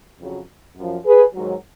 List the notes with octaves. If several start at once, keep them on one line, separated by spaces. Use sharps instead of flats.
F2 C#3 F#3
F#2 F3
G#4 B4
G#2 D#3 F#3